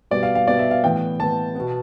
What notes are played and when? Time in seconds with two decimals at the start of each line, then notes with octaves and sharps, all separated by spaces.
0.11 B2 G3 B3 D5
0.23 F5
0.35 F5
0.47 B2 G3 B3 D5
0.59 E5
0.71 F5
0.84 A2 E3 B3 G5
1.20 A2 E3 B3 A5
1.55 B2 B3